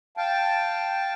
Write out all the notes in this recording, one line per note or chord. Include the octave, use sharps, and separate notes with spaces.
F5 G5 A5